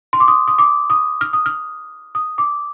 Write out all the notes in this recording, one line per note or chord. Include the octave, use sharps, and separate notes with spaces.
C6
D6
D#6
D#6
D6
D#6
F6
D#6
F6
D#6
D6